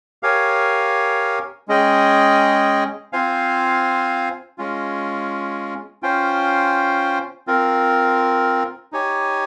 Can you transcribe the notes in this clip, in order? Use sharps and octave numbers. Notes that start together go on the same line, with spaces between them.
G4 A#4 C#5 F5 G#5
G#3 C#4 G#4 D#5 G5
C4 F4 C5 F5 G#5
G#3 C#4 F4
C#4 F4 C5 G5
C4 F4 A#4
D#4 G4 C#5 G#5